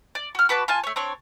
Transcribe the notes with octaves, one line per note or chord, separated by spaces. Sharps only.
D5
F#4 F6
F#4 B4 A5 D6
F4 G#5 A5
A3 C#5
C4 D4 C#5